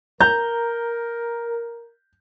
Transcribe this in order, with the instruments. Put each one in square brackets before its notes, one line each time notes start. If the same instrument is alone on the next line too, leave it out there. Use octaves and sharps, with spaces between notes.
[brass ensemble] A#4 [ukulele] A#5 [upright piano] G6